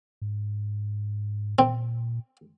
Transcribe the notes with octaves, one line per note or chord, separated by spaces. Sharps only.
G#2
A#2 C4